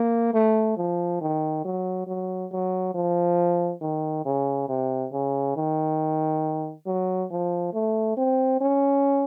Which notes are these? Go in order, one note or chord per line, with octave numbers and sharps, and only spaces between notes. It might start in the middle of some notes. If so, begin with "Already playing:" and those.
Already playing: A#3
A3
F3
D#3
F#3
F#3
F#3
F3
D#3
C#3
C3
C#3
D#3
F#3
F3
A3
C4
C#4